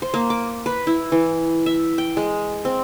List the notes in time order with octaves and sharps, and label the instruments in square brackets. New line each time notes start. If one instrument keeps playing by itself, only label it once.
[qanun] C5
A#3
D6
B4
E4
E3
E5
G5
G#3
C4